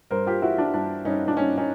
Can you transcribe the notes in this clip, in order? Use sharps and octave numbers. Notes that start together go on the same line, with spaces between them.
G2 A#4 C5
F4 G4
E3 E4 F#4
D4
G2 D4
G2 C#4 D#4
D4
G2 C#4 D#4
C#4 D#4